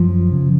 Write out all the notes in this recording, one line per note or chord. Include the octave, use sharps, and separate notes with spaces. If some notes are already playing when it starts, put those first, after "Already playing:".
Already playing: F#2 F3
C#3